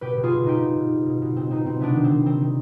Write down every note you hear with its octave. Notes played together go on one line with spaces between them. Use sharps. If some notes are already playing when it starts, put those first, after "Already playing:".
B2 G4 B4
B2
F4 G#4
B2
B2 D#4 G4
B2
B2
B2
B2
B2
B2 C4
B2 C4 D#4
B2 C4
C3 B3 D4
D#3
C4
D#3
D#3 C4
D#3